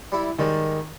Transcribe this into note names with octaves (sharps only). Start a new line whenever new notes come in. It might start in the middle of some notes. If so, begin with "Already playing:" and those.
G3 E4
G#2 D#3 G3 G#3